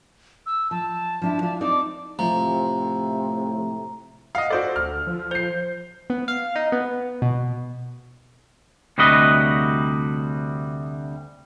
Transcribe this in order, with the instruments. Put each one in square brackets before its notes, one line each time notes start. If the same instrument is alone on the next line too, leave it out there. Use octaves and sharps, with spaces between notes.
[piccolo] E6
[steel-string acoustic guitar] F3 [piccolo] A5
[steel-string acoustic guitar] F3 D4 E4
E4 F4 D5
[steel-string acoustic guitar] C4 D#4 D5 [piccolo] D6
[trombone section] A2 C3 [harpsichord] F3 [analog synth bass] A3 [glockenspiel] A#5
[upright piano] D#5 F5 [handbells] F#5
[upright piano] F#4 C5 D5 [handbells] A4
[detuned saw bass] D2 [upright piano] F6
[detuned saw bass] F3
[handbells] C5 [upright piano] G6 C7
[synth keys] B3
F5
D#4
B3
B2
[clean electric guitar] D2 C3 G3 F#4 B4 D#5